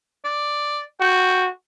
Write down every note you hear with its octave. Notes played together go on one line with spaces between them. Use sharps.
D5
F#4 G5